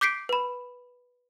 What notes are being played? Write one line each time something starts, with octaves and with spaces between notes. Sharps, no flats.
D6 G6 B6 C7 D7
B4 B5